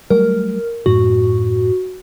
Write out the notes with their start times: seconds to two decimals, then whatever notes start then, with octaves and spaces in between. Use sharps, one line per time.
0.10 F#3 G3 A3 A#4
0.86 F#2 A2 F#4